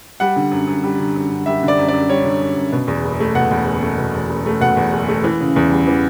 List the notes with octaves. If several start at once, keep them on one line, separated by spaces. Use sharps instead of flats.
G3 F#5
D3
F#2
F#2
G3
D3
F#2
F#2
G3 E5
D3
D5
F#2
D5
F#2
G3 C#5
D3
F#2
F#2
B2
E2
F#1
A3
B2 F#5
E2
F#1
A3
B2
E2
F#1
A3
B2 F#5
E2
F#1
A3
E3
C#3
E2
G3
E3